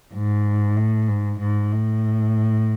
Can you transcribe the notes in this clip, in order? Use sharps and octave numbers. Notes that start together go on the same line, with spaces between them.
G#2
A2
G#2
G#2
A2